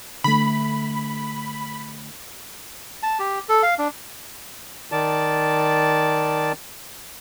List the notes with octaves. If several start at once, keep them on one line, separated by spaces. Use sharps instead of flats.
D3 A3 B5
A5
G4
A4
F5
D4
D#3 D5 A5